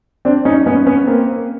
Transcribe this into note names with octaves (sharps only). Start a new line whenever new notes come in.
C4 D4
C#4 D#4
B3 C#4
B3 C#4
A#3 C4